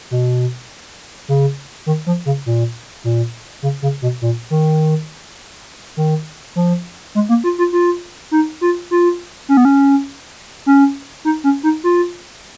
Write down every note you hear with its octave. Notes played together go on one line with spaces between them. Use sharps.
B2
C#3
D#3
F3
C#3
A#2
A#2
C#3
C#3
B2
A#2
D#3
D#3
F3
G#3
A#3
F4
F4
F4
D#4
F4
F4
C#4
B3
C#4
C#4
D#4
C#4
D#4
F4